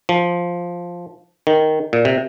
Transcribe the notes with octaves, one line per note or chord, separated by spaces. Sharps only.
F3
D#3
A#2
C3